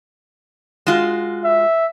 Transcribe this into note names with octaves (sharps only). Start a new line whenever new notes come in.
G#3 F4 F#4
E5